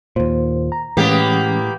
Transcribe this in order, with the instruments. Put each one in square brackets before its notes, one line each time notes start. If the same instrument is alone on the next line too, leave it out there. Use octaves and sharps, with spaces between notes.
[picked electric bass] D#2 A#2 [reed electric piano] C5
[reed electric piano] A#5
[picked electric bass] A2 [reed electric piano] E3 G#3 C#4 [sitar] A#3 B3 G4